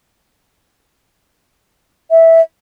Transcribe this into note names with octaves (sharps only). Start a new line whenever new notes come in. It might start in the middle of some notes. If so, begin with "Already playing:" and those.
E5